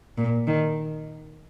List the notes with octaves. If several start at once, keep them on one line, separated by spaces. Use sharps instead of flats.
A#2
D#3